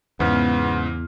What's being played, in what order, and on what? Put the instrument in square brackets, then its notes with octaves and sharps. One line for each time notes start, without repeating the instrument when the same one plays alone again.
[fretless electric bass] E2 [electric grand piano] G#2 C#3 F6 [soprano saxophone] B3